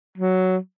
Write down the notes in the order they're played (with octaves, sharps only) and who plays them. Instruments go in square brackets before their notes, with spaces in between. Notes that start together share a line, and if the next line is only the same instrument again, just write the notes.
[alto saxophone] F#3